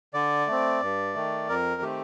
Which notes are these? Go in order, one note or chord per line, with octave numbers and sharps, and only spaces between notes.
D3 D5
A3 C4
G2
D#3 A3
F2 A#4
D#3 A3 C4 G4